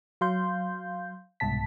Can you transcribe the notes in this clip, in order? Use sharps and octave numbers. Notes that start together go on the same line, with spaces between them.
F#3 F5 C6 G6
C2 G#2 B2 A5 B6